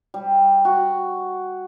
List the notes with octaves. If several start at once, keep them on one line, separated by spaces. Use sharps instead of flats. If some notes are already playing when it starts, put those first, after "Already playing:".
G3
F#4